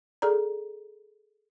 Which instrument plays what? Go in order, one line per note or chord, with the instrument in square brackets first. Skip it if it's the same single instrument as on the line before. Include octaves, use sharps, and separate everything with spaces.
[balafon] G#4 A4 D5 A#5